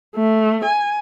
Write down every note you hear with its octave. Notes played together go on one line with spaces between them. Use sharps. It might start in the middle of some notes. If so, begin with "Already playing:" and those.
A3
G#5